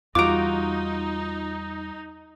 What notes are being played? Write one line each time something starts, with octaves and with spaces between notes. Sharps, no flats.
E2 G3 D#4 F4 F#4 A#5 D6 D7